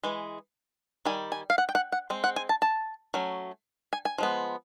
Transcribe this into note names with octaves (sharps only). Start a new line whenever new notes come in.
E3 G#3
D#3 G3 G#5
G#5
F5
F#5
G5
F#5
F#5
G#3 C4
F#5
G#5
A5
A5
F#3 A3 C#4
G#5
G#5
F3 G#3 B3